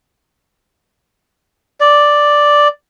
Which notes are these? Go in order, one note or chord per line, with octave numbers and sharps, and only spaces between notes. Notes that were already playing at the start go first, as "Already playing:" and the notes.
D5